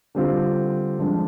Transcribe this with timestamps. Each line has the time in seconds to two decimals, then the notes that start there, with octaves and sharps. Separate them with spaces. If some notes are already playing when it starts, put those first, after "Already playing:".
0.15 D3 G3 C4 F4
0.99 F3 G#3 D4